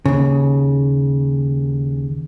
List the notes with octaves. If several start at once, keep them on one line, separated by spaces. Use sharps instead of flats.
D#2 C#3